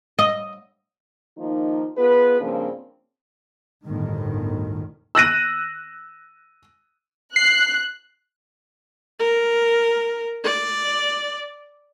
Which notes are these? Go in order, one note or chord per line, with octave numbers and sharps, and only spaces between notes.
D#5
D#3 F3 A#3 D#4
B3 F4 G#4 B4
G2 C#3 F3 A#3 C4 D4
G1 D2 A2 D#3
E6 F#6 A#6 D#7
F#6 C7
A#4
D5